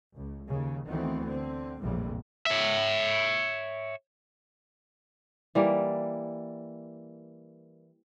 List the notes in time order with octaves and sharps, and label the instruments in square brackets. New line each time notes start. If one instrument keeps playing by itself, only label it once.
[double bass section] C#2
D#2 C#3
D2 D#3 E3 A3 B3 C4
D3 C4
A#1 F2 A2 C3 E3 G3
[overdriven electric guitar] C#5 E5
[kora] E3 G3 A#3